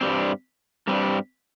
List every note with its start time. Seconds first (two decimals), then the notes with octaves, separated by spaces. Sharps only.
0.01 G2 G3 C4
0.87 G2 G3 C4